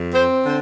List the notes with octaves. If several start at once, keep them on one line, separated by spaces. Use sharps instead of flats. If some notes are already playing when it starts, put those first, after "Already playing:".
Already playing: F2
C4 C5
D3 C5